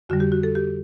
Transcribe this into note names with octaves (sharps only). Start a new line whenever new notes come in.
F2 D3 G3 F#4
G4
F#4
A4
G4